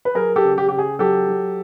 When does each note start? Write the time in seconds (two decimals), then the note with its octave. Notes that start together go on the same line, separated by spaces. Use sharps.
0.05 B4
0.15 F#3 G#4 A#4
0.36 G4 A4
0.44 C#3
0.58 G4
0.69 C#3 G4
0.78 G#4
0.99 F#3 G4 A4
1.28 F#3